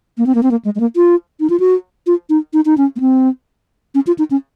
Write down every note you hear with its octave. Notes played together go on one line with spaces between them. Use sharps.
A#3
C4
A#3
C4
A#3
G#3
G#3
A#3
F4
D#4
F4
F#4
F4
D#4
D#4
D#4
C#4
A#3
C4
C#4
F4
D#4
C#4